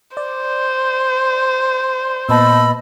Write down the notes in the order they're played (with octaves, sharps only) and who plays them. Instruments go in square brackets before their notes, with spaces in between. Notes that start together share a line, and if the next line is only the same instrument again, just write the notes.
[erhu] C5 [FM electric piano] D5
[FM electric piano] A#2 B3 A5 [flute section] D#5 B5 E6